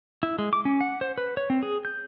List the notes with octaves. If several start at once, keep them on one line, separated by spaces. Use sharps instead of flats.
E4
G#3
D6
C#4
F#5
C5
B4
C#5
C4
G#4
G6